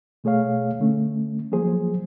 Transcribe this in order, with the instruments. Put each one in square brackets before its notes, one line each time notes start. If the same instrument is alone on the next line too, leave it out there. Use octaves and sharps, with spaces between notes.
[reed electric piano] B2 A3 G#4 C#5 F5
D3 A3 C#4
F3 F#3 A#3 G#4 C5